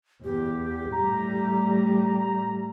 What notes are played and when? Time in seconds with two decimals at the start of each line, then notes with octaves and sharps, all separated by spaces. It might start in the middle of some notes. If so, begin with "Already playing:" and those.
0.24 E2 G4
0.92 A2 G3 A3 A#5